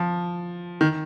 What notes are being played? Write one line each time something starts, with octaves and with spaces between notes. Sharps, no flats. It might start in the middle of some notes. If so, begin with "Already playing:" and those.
Already playing: F3
D#3